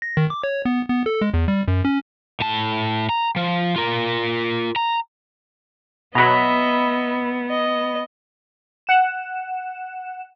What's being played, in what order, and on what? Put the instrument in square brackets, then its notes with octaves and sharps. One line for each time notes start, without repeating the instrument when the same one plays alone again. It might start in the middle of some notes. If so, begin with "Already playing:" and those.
[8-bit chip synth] A#6
D#3
D6
C#5
B3
B3
A4
G#3
E2
G3
F#2
C#4
[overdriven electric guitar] A2 A5
A#5
F3
F4 A#4
A#5
[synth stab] B2 F#3 [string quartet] B3 [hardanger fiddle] D#5 E5 [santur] A#5 B5
[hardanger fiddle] D#5
[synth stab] F#5 E7